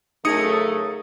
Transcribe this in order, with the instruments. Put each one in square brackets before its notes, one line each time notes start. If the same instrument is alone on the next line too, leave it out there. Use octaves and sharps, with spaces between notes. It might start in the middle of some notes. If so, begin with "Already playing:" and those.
[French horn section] C#3 F#3 A3 [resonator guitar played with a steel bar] D#4 G#4 A#4 [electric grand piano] D#6 C#7